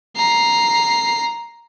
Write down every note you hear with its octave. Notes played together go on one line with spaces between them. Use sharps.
A#5 C7